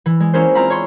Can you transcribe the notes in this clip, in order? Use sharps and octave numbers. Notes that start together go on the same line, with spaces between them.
E3
G#3
A#3 C#4 E4 G#4 A#4 C5
C4 F4 E5 A#5 B5
C#5 C6